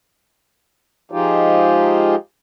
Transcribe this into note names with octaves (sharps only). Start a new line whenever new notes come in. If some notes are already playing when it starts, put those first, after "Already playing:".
F3 G#3 D#4 F4 G4